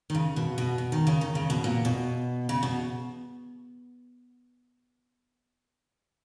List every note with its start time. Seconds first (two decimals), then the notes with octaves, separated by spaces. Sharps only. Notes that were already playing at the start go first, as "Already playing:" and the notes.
0.10 D#3
0.15 C#3
0.36 B2
0.58 B2
0.78 B2
0.92 D#3
1.07 C#3
1.21 D#3
1.35 C#3
1.50 B2
1.64 A#2
1.85 B2
2.49 C#3
2.63 B2